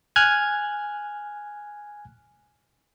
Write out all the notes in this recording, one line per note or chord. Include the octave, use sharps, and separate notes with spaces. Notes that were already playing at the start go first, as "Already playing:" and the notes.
G#5 F6 F#6 G#6